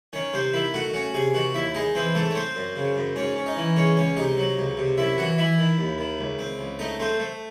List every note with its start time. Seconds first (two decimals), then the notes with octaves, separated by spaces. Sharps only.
0.13 D#3 C#4 C#5
0.33 C3 C4 C5
0.53 D#3 E4 E5
0.74 A3 F#4 F#5
0.94 C#4 F#4 F#5
1.14 C3 G#4 G#5
1.34 D#3 F#4 F#5
1.54 D#2 E4 E5
1.74 G#3 D#4 D#5
1.95 E3 C4 C5
2.15 G#2 A3 A4
2.30 C#5
2.35 C4 C5
2.55 F#2
2.76 C#3
2.96 F#2
3.16 G#2 C#4 C#5
3.36 C#4
3.46 D#4 D#5
3.56 E3
3.76 G#3 C#4 C#5
3.97 C#2 C#4 C#5
4.16 C3 D#4 D#5
4.38 F#3
4.58 C#2
4.77 C3
4.98 F#2 E4 E5
5.18 E3 F#4 F#5
5.38 E3 E4 E5
5.58 D#3
5.78 D#2
5.98 D#3
6.19 C#2
6.39 C4
6.59 C#2
6.79 A3 D#4 D#5
6.99 A3 C4 C5
7.20 A3